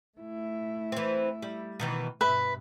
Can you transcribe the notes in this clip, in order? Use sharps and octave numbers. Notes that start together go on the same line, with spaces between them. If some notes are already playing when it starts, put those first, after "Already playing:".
A3 E4
E3 C4
G3
B2 D#3 E3
G2 B2 B4 E5